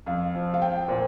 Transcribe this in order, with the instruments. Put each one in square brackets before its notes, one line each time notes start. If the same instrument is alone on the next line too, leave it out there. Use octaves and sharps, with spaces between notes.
[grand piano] F2 [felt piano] F5
[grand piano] F3
[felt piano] F5
[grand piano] C4 [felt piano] G5
[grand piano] A#2 [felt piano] C5